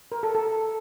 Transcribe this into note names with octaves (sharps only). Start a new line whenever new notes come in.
A#4
A4
A4